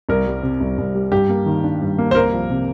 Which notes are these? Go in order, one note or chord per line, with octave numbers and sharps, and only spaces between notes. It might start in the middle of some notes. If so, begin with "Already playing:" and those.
C2 A#4
G3
C3
C2
C2
G3
G2 G4
A#3
D#3
D4
G2
A#3
C5
C2 A#4
F3
C3